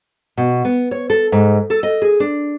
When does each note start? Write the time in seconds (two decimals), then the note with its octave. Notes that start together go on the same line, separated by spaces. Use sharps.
0.37 B2
0.65 B3
0.91 C#5
1.10 A4
1.32 G#2
1.70 A4
1.83 D#5
2.02 G#4
2.20 D4